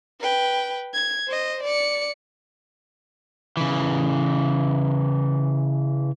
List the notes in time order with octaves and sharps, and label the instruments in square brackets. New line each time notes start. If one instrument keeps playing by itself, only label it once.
[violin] B4 G5
G#6
C5 D#5
D5 C#7
[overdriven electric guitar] C#3 E3